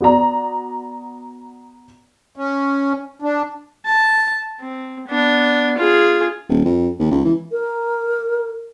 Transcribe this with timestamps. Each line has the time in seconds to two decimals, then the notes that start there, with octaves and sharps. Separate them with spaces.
0.01 B3 F#4 D5 A#5
2.36 C#4
3.22 D4
3.86 A5
4.60 C4
5.08 B3 D4
5.77 F4 G#4
6.49 D#1
6.65 F2
6.99 D#2
7.11 C#2
7.25 E3
7.52 A#4